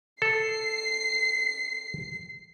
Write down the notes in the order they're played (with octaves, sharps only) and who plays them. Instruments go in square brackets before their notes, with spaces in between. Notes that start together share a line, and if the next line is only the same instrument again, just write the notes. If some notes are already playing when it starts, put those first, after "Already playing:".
[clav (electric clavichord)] A4 [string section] C7